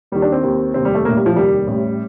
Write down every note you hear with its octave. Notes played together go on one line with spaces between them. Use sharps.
D#2 D#3 G3
D4
C4
D#2 D#3
F1 D#2 D#3 C4
G3
A3
A#1 A2 A#3
G3
F3
F1 D#2 D#3 G3
A1 A2